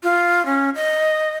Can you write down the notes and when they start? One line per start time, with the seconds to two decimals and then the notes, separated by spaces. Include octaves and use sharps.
0.03 F4
0.46 C#4
0.75 D#5